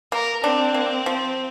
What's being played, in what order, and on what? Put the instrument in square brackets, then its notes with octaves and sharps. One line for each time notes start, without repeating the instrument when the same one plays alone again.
[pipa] A#3 [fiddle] A#4
[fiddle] C4 [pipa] D4
[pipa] A#3
F3